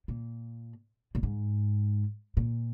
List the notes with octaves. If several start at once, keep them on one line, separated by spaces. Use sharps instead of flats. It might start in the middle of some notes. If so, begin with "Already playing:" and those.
A#2
A#2
G#2
A#2